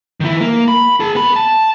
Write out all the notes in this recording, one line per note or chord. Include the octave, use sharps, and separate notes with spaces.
D#3 E4
A#3
B5
G#4 A5
B3 B5
A5